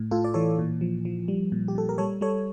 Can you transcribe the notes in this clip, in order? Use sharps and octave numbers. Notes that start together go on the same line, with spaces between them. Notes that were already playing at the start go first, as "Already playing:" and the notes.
Already playing: A2
A2 F4 A4
D5
E3 A4 C#5
A#2
F3
F3
G3
A#2
G4
A#2 A4
A#4
G3 A4 C#5
G3 A4 C#5